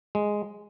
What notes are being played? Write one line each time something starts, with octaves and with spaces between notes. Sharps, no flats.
G#3